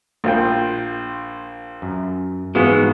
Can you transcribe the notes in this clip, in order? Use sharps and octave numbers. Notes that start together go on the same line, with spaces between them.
A#1 F4 G5
F#2
G#2 E3 G#3 B3 F#4 F5